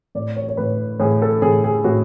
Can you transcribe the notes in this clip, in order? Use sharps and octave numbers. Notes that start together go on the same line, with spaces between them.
A2 D5
C#5
C#5
A2 B4
A2 G#4
A4
A2 G#4
G#4
A2 F#4